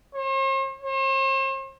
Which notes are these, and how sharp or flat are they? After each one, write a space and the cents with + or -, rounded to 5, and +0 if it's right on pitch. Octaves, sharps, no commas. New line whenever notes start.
C5 +45
C5 +45